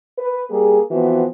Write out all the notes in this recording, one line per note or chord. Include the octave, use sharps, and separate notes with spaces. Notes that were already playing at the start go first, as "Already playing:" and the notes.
B4
G3 A#3 G#4
E3 F3 B3 C4 F#4